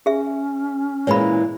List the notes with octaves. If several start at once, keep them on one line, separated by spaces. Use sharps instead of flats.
C#4 G#4 E5
A#2 E3 G#3 C#5 B5